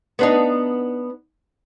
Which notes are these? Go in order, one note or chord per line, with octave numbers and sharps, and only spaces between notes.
B3 D4 D#4